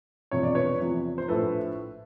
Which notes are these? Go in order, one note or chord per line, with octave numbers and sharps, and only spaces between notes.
E1 E2 C3 F3 C#5
D5
B4 C#5
E2 C3 F3
C5
A#1 A2 F3 A4 B4